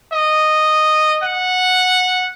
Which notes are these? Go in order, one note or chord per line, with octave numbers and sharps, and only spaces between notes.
D#5
F#5